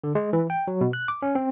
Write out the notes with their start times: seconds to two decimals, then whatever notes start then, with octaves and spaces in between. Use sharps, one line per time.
0.04 D3
0.15 G#3
0.33 E3
0.50 G5
0.67 F#3
0.81 B2
0.93 F#6
1.08 D6
1.22 C#4
1.35 C4